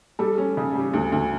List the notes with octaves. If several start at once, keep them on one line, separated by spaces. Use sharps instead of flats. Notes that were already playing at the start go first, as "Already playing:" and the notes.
G3 A4
C#4
C#3
G3
D2
D2